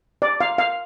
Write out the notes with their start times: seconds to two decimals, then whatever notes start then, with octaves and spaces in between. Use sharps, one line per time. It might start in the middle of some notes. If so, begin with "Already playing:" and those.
0.22 D5
0.41 F5
0.58 F5